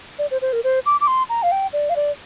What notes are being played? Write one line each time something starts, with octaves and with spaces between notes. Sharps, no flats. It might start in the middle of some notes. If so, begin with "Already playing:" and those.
D5
C5
C5
A#4
C5
D6
D6
C6
A#5
F5
G5
D5
F5
D5